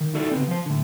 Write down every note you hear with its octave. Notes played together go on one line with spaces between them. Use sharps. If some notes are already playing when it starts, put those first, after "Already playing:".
D#3
D#4 E4 F#4 A4 D5
C#3 B3 C4
F3 C5
A2 D3